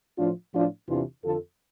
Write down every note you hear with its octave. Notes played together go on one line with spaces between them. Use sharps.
A2 F3 D4 F4
A2 F3 D4 F4
E2 C3 E3 D4 F4
F2 D3 F3 F4 A4